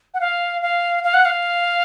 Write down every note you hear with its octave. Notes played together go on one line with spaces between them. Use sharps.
F#5
F5
F5
F5
F#5
F5